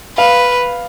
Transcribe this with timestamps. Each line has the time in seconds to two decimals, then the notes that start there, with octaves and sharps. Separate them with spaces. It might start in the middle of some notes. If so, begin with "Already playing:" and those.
0.17 B4 F5